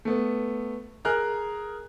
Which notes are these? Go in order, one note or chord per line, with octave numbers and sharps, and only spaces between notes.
A3 B3
G#4 A#4 F6 F#6